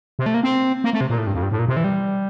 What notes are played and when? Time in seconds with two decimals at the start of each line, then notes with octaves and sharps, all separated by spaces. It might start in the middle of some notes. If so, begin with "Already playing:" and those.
0.19 C3
0.26 A3
0.34 A#3
0.43 C4
0.84 A#3
0.93 A3
1.01 C3
1.10 A#2
1.18 A2
1.27 G2
1.34 F2
1.43 G2
1.52 A2
1.59 A#2
1.68 C3
1.77 E3
1.84 G3